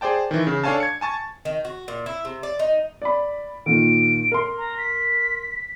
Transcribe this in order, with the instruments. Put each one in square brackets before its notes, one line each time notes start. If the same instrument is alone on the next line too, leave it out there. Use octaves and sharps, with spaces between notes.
[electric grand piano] G#4 C5 D5 G5 A5
D#3 E3
C#3
D4 A4 C#5 F5 G#5 A5
G#6 C#7
G#5 A5 C#6 A6
[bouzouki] D#3
F#4
A#2
E4
C3
D5
D#4
[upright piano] D5 B5
[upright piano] A#2 D#3 [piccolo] D7
[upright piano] A#4 C6
[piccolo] A#5
B6